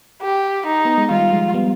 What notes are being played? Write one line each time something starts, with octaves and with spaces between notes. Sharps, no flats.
G4
D#4
B3
G#3
D#3 G3 F4
F3 G#3
G3 B3